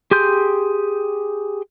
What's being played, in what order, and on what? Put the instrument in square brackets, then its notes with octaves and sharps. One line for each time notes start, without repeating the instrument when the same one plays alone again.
[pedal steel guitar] G4 G#4 C6 G6